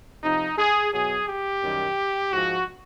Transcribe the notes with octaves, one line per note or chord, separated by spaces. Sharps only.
C3 F3 D#4
G#4
B2 F#3 G#4
G4
F#2 D#3 G3
G#2 F3 F#4